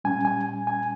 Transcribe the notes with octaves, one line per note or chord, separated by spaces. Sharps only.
A#2 G3 C#4 G#5
G#5
G#5